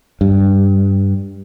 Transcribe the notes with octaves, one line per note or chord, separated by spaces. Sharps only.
G2